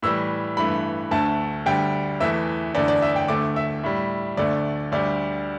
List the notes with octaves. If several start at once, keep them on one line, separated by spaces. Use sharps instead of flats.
A2 E3 G3 E6
G2 E3 A3 B5
D2 D3 A3 A5
D2 D3 G3 G5
E2 E3 A3 E5
E2 D3 A3 D5
D5
E5
G5
D2 D3 A3 D6
E5
A2 G3
D2 D3 A3 D5
D2 D3 G3 D5